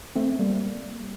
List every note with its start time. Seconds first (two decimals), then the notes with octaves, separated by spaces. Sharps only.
0.16 A3 C4
0.39 G3 A#3